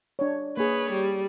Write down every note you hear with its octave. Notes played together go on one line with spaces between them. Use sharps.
D4 C#5
A#3 G#4 B4 C#5
G3